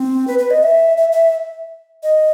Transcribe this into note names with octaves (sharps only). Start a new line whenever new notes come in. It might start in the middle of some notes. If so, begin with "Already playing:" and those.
Already playing: C4
B4
B4
D#5
E5
E5
E5
D#5